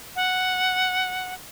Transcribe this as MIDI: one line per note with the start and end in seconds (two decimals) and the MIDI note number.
0.16 1.34 78